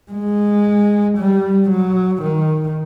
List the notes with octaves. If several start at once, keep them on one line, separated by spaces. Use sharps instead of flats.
G#3
G3
F#3
D#3